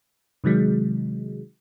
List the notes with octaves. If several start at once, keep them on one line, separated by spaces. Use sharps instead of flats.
C3 D#3 F#3 G#3